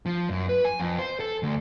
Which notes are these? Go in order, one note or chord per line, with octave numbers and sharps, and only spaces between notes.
F3
F#2
B4
G#5
F2
C5
A4
D2